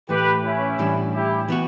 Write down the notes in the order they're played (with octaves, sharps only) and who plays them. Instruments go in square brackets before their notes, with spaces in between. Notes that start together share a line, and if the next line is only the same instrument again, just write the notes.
[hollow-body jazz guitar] A2 E3 A3 [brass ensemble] G4 B4
[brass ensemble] C#4 E4
[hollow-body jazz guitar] A2 E3 G3 D4
[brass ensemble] E4 G4
[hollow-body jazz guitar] E3 B3 F#4